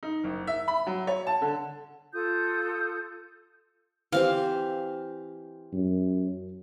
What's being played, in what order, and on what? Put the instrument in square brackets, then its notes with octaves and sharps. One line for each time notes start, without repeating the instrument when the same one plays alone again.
[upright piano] D#4
F#1
E5
B5
F#3
C#5
A5
D3
[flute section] F4 A4 D#6 G6
[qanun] E3 C4 G4 [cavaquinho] F5
[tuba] F#2